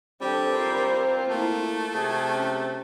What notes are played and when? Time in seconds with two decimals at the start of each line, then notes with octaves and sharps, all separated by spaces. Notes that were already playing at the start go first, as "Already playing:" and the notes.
0.21 G3 C4 D4 G4 A4
0.54 F4 A#4 C5
1.30 A3 A#3 E4
1.95 C3 G#4
2.37 C#4